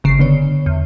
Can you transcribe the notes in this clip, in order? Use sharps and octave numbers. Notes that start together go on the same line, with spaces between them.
G1 C#3 C7
D3 B3 C#5
E2